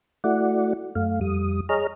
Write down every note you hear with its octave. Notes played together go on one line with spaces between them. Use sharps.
A3 E4 F#4 D5 F#5
F#2 A3 F5
F2 G3 D#6
G#4 C#5 D#5 A#5 F6